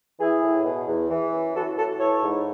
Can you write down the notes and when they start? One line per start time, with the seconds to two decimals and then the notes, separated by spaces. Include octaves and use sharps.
0.20 E3 E4 G#4
0.42 A2
0.64 B2
0.88 E2
1.10 E3
1.33 F#2
1.54 E3 F#4 A4
1.77 A2 F#4 A4
1.99 E3 A4 C#5
2.23 G#2